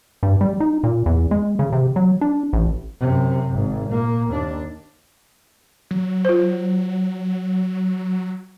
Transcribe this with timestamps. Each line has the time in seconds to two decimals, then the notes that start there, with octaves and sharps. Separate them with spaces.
0.23 G2
0.41 G3
0.60 D#4
0.84 A#2
1.06 E2
1.31 G#3
1.59 C#3
1.73 C3
1.96 F#3
2.21 D4
2.53 A1
3.00 F#2 C3
3.50 G#1
3.90 A#2 A#3
4.30 D#2 D4
5.91 F#3
6.25 F4 C5